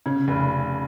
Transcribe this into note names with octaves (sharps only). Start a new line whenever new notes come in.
C#3
F1